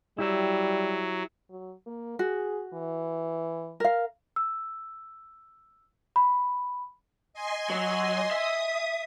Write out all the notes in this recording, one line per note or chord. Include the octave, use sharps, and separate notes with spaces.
F#3 G3 E4 G4 E5
F#3
A#3
F#4 G#4
E3
A#4 F5
E6
B5
D#5 G#5 C6
F#3
E5 D#6